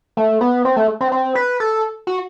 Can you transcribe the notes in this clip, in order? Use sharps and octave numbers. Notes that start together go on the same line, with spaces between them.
A3
B3
C4
A3
C4
C4
B4
A4
F#4